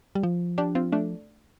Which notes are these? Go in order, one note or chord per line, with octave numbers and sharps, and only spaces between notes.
G3
F3
D4 G4
C4 F4
A3 D4